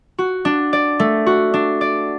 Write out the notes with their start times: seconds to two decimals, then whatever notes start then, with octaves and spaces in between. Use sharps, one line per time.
0.18 F#4
0.45 D4
0.73 D5
0.99 A3
1.26 F#4
1.54 D4
1.81 D5